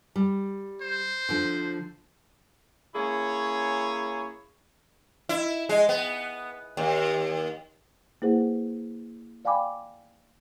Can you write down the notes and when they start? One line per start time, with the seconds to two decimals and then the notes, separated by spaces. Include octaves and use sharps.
0.16 G3
0.81 C5
1.29 D3 F3
2.95 A#3 C#4 E4 G#4 C#5
5.29 E4
5.69 G#3
5.89 B3
6.77 D#2
8.22 A#3 E4 G#4 B4 C5 F#5
9.45 D5 F5 G5 G#5 B5 D6